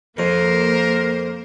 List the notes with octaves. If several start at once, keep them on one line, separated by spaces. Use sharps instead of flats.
F2 A#3 A#4 C5